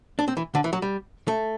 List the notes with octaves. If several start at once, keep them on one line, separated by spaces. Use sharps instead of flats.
D4
C4
E3
D3
E3
F#3
G3
A3